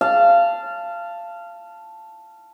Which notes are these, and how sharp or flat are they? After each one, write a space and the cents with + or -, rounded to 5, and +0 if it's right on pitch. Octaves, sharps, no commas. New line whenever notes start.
F5 -20 A5 +0